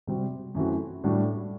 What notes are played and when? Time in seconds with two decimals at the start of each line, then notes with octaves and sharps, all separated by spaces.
0.07 C3 G3 C4 F#4
0.55 F#2 E3 A3 C4 F#4
1.04 A2 G3 D4 F#4